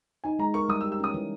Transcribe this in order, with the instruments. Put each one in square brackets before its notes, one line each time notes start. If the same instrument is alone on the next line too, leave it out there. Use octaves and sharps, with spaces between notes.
[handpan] D#4 [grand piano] G#5
[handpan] G#3 [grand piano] A#5
[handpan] A#4 [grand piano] C#6
[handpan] G3 [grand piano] D#6
[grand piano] E6
[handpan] G4
[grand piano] E6
[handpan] C#4 [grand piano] D#6
[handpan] E3